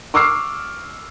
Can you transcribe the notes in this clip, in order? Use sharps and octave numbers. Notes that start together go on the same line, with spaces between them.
C#6 D6 E6 F6 C7